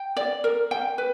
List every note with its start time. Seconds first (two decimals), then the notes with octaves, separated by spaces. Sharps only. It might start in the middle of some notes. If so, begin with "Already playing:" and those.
Already playing: G5
0.17 D5
0.44 A#4
0.71 G5
0.98 B4